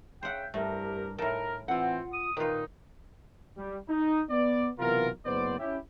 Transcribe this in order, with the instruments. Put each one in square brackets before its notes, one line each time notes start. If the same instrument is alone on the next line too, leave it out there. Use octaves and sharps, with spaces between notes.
[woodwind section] C#3 E5 G5 [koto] C5 F#5
[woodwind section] C2 G4 A#4 [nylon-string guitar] G2 [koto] A3
[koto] A2 A4 [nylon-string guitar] D#4 [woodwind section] A#4
[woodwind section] E3 C4 [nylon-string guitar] F4 F#5
[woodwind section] D#6
[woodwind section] A#2 D#4 [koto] D#3 F4 [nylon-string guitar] B4
[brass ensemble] G3
D#4
B3 D5
B1 C3 E3 B3 F4 A#4
F#1 B3 C5 D5
C#4 E4 G4